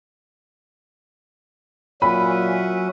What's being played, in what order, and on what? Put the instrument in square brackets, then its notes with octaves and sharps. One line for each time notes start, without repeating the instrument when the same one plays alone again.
[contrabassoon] A#2 [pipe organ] F#3 F#4 G#5 [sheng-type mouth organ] C#4 E5 F#5 [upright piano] B5